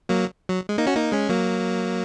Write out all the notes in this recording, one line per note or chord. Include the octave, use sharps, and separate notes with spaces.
F#3 A#3
F#3
G#3
A#3 D#4
C#4 F#4
A#3 D#4
G#3 C#4
F#3 A#3